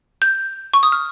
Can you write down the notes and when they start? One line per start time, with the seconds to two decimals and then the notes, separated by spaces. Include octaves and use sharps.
0.22 G6
0.73 C#6
0.83 D#6
0.92 F6